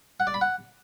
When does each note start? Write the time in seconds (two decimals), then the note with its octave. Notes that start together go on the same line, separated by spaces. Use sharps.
0.20 F#5
0.27 D5
0.34 B5
0.41 F#5